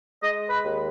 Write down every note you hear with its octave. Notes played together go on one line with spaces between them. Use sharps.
G#3 D#5
B4
D#2